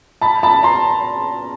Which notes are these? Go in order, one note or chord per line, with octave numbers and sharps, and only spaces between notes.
A5 B5
A5 B5
A#5 C6